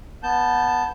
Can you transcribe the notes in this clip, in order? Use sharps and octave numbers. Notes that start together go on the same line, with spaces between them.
B3 A5 G6